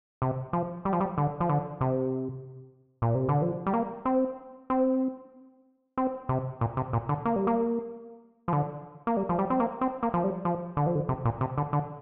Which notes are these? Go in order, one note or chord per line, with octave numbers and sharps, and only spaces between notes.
C3
F3
G3
F3
G3
D3
F3
D3
C3
A#2
C3
D3
F3
G3
A#3
C4
C4
C4
C3
A#2
C3
A#2
D3
A#3
G3
A#3
F3
D3
A#3
G3
F3
G3
C4
A#3
C4
A#3
F3
G3
F3
D3
F3
D3
C3
A#2
C3
D3
D3